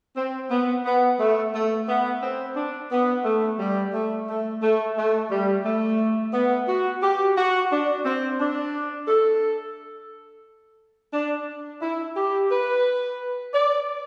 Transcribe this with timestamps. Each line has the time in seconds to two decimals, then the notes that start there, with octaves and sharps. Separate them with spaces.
0.16 C4
0.50 B3
0.86 B3
1.19 A3
1.54 A3
1.89 B3
2.23 C4
2.56 D4
2.91 B3
3.25 A3
3.59 G3
3.93 A3
4.29 A3
4.62 A3
4.97 A3
5.31 G3
5.65 A3
6.33 B3
6.68 F#4
7.03 G4
7.37 F#4
7.71 D4
8.05 C4
8.40 D4
9.08 A4
11.13 D4
11.82 E4
12.16 G4
12.51 B4
13.54 D5